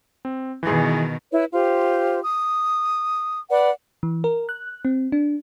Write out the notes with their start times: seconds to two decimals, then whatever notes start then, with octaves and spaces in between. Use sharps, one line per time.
0.25 C4
0.63 B2 D#3 E3 G#4
1.31 E4 B4 C#5
1.52 F4 G4 C5
2.22 D#6
3.49 B4 D5 F#5
4.03 E3
4.24 A#4
4.49 F#6
4.85 C4
5.12 D4